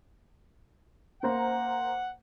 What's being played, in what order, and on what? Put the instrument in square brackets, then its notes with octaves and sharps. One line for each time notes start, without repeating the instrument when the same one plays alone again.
[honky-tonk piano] A#3 C5 A#5 [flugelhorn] F#5